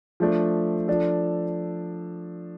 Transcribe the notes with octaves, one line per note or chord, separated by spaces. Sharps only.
F3 A3 D4
F3 D4 A4